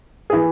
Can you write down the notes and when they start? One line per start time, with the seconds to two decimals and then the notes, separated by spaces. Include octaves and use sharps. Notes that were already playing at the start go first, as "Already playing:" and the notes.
0.30 G#4
0.33 E3